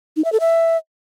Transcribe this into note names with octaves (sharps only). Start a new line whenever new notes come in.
D#4
E5
A4
E5